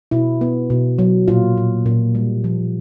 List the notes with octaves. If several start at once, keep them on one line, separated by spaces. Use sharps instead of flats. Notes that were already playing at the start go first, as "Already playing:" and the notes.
B2 E4
B3
B2
F#3
A#2 F4
A#2
A#2
G3
F3